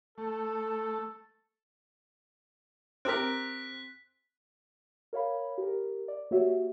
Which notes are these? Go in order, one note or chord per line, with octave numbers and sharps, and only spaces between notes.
A3 A4
C4 G4 A#4 F#6 B6
A#4 C#5 F5 B5
G4 A#4
D5
A#3 F#4 G4 C#5 E5